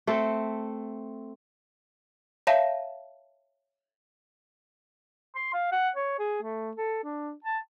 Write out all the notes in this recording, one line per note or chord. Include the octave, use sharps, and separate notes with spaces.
A3 C4 A4
C#5 E5 F5 A5 A#6 E7
C6
F5
F#5
C#5
G#4
A3
A4
D4
A5